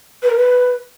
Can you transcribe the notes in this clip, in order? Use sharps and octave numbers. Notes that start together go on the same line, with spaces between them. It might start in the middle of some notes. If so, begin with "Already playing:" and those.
B4
A#4
B4